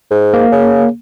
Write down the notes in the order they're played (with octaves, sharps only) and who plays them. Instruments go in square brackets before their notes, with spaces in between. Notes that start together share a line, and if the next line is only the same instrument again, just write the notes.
[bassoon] G#2
[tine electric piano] A#3
[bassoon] C#3